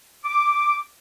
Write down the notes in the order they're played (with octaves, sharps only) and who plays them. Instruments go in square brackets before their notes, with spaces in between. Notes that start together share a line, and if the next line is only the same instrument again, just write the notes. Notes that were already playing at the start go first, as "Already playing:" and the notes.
[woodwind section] D6